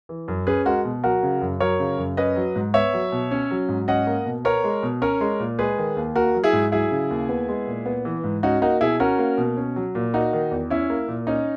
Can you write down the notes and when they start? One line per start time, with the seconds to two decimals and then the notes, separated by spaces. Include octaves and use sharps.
0.09 E3
0.28 F#2
0.47 C#4 G#4 B4
0.65 G#3 F#4 A#4
0.85 B2
1.04 F#3 F#4 A#4
1.23 C#3
1.42 F#2
1.60 F#3 A#4 C#5
1.80 C#3
1.99 F#2
2.17 C#4 B4 D#5
2.36 F#3
2.56 G#2
2.74 B3 C#5 E5
2.93 F#3
3.12 B2
3.31 C#4
3.51 F#3
3.69 G#2
3.88 C#4 D#5 F#5
4.07 A#3
4.26 B2
4.45 B3 A#4 C#5
4.64 G#3
4.83 B2
5.02 C#4 A#4 C#5
5.21 G#3
5.40 A#2
5.59 G#3 G#4 B4
5.78 D#3
5.96 D#2
6.15 A#3 F#4 A#4
6.35 F#3
6.44 E4 G#4
6.53 G#2
6.72 F#3 E4 G#4
6.91 C#3
7.10 D#2
7.29 B3
7.48 G#3
7.67 A#2
7.86 B3
8.05 E3
8.24 G#2
8.43 C#4 D#4 F#4
8.62 A#3 D#4 F#4
8.81 B2 E4 G#4
9.00 C#4 F#4 A#4
9.19 A#3
9.38 B2
9.57 C#4
9.76 F#3
9.95 A#2
10.14 A#3 D#4 F#4
10.33 D#3
10.51 E2
10.70 C#4 E4
10.90 A#3
11.08 A#2
11.27 C#4 D#4